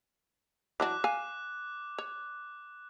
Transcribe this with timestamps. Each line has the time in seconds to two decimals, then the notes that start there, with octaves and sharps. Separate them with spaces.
0.80 E3 F#3 D4 D6 F#6
1.04 F5 G#5
1.98 C#5